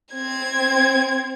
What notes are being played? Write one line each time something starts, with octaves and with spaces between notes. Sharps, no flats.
C4 G#6